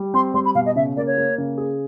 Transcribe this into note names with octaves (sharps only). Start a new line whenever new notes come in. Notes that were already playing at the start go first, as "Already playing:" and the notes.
Already playing: G3
C4 C6
G3 C6
B5
B2 F5
D#5
C#3 E5
A#3 D5
C#5
A#3
C#3
G#4